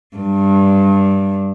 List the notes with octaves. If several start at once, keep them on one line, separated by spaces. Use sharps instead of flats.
G2